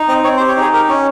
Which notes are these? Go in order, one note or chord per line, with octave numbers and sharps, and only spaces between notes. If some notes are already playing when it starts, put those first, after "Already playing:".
Already playing: D#4
C4 D#5
C4 C#5
C5
G4
C#5
D#4 G#4
G4 A#4
C#4